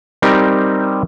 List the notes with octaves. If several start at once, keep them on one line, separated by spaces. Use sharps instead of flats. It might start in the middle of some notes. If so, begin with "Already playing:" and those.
G3 C4 D#4 G4 A#4